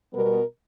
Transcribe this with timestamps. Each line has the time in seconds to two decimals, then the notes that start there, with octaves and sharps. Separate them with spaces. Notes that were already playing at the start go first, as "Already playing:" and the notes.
0.13 B2 G3 B3 A#4